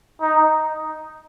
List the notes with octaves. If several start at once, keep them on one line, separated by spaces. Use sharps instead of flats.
D#4